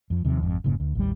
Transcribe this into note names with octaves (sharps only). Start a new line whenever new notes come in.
F2 F3
D#2 C3 F3
G#1 F2
F1 G#2 C#3 A#3
D2
A1 D#2 G3